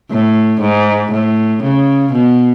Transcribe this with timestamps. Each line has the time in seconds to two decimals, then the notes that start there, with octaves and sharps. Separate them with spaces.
0.11 A2
0.61 G#2
1.12 A2
1.63 C#3
2.13 B2